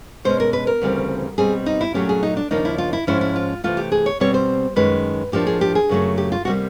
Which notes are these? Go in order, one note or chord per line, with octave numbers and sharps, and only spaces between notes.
B2 G#3 C#4 C5
A#4
B4
A#4
D2 C#3 E3 G3 C4
B2 G3 C4 G#4
D#4
E4
A#2 F#3 A3 C#4 G4
G#4
D#4
D4
D#2 C#3 F3 A#3 D4 D#4
E4
F4
E4
G#2 F3 G#3 C#4 E4
E4
F4
C3 E3 A3 F4
G4
G#4
C#5
B2 G3 C4 C#5
C5
F#2 D#3 G#3 C#4 B4
A2 F3 A#3 D4 G4
G#4
G4
G#4
F#2 C#3 F#3 A3
G4
F4
C3 D#3 G3 A#3 F#4